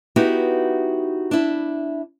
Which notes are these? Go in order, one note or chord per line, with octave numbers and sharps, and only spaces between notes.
B3 D#4 E4 F#4 G4
D4 E4